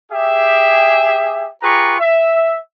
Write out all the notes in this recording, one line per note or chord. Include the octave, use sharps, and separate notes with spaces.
G4 G#4 E5
F4 G4 G#4 B4 A#5 C#6
E5